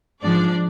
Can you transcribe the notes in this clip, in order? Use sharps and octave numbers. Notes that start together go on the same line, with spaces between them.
G#2 F3 G#3 D4 D5